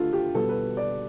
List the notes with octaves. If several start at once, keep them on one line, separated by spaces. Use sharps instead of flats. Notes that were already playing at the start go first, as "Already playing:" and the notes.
Already playing: D3 A3 D4 F4 A4
G4
B2 G3 B3 A4
B4
D5